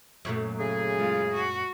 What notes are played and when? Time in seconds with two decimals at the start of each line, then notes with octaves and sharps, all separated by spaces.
0.25 F#2 A#2 A3
0.60 C#3 G#4
0.96 G#3 F4
1.32 F#4